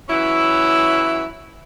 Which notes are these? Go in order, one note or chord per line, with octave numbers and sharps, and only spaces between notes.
E3 F#3 C#4 E4